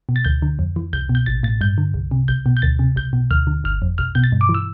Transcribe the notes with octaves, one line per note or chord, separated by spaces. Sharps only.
B2
A6
D2 G6
D3
F2
E3
C2 G6
B2
G6
A1 A6
A2 A6
G2 G6
D3
C2
C3
B1 G6
B2
G6
D2 A6
C3
B1 G6
B2
D2 F6
D3
G1 F6
F2
B1 F6
B2 G6
A6
G2
D6
E3
E6